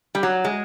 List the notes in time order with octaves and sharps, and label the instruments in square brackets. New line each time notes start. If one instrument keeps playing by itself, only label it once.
[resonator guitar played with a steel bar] G3
F#3
G#3